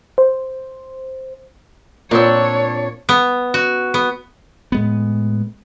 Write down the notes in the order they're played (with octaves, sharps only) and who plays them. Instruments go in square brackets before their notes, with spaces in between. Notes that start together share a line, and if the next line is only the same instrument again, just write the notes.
[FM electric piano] C5
[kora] A#2 C4 G5 [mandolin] D4 E6 [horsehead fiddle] C#5
[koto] B3
F#4
B3
[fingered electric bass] A2 G#3 B3